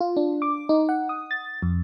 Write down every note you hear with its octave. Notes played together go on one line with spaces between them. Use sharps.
F4
D4
D6
D#4
F#5
D#6
A6
F2